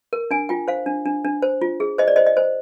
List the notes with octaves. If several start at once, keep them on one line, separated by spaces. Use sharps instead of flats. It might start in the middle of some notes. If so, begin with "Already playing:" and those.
A#4
D4 G#5
F4 G5
C5 F5
D4
D4
D4
C5
F4
G#4
C5 D#5
D5
C5 D#5
D#5
C5